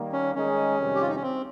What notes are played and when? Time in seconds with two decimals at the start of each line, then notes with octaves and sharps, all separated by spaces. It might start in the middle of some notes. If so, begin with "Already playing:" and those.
Already playing: D#3 G3 A#3
0.12 C#4
0.35 D#3 G#3 C#4 D#4 G#4
0.78 F2 C3 D#3 G3
0.95 G4
1.01 F4
1.09 D#4
1.16 C#4
1.22 C4